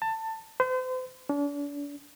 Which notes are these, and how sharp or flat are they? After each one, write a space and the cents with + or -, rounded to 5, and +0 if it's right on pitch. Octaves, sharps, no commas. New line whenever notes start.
A5 +20
C5 -40
D4 -40